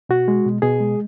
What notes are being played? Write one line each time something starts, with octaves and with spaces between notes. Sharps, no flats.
B2 F#4
G#3
B2
B2 G#4
G#3